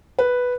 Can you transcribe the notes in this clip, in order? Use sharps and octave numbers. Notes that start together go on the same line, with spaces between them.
B4